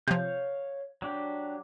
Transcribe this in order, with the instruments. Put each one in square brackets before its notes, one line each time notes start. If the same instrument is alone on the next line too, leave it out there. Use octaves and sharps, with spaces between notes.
[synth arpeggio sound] C3 F3 [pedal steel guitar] C#5 F5 G6
[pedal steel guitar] F#3 D4 G4